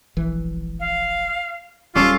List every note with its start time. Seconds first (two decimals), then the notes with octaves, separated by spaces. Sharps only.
0.17 E1 A#1 E3
0.80 F5
1.95 D1 G3 C#4 F4 A4 D6